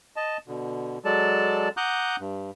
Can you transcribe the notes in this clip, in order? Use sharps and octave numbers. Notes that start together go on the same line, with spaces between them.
D#5 A5
B2 D3
F#3 G#3 A4 D5 A5
F#5 A#5 D6 D#6 F#6 G6
G2